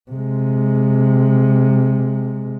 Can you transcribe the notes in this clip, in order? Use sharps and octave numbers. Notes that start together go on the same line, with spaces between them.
C3 G#3